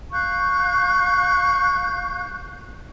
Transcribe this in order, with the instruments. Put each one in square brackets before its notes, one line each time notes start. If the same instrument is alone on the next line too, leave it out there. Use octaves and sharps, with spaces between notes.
[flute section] F5 C#6 F#6 G6